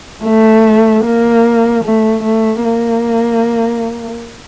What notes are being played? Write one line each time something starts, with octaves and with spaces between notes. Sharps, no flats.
A3
A#3
A3
A3
A#3